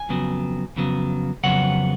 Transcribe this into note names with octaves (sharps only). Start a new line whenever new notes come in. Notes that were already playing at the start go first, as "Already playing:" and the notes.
Already playing: G#5
F2 C#3 F#3 B3
F2 C#3 F#3 B3
F2 C#3 F#3 B3 F#5